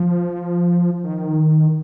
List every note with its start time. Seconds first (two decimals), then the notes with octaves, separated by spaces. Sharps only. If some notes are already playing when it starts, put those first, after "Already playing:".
Already playing: F3
1.04 D#3